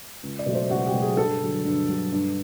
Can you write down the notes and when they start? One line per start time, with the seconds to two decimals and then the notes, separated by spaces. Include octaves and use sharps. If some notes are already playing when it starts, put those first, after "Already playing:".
0.23 C#2
0.39 D5
0.46 B2 F#3 A3
0.55 C5
0.70 C#2 F#4
0.86 G4
0.94 B2 F#3 A3
1.02 G#4
1.17 G2 A4
1.42 D3 F#3
1.65 G2
1.89 D3 F#3
2.12 G2